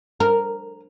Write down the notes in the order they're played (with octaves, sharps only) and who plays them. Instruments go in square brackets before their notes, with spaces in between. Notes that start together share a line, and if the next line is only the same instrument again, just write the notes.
[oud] A#4